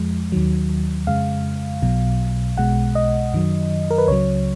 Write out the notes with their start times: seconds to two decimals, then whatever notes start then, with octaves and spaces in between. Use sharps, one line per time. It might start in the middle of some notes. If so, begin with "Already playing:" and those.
Already playing: F2 F3 G#3
0.32 D#2 D#3 F#3
1.07 F2 C#3 G#3 F5
1.82 B1 B2 F#3
2.57 B1 B2 G#3 F#5
2.95 D#5
3.33 F#2 D#3 F#3
3.91 A#4
3.98 B4
4.08 C#2 C#3 F#3 C#5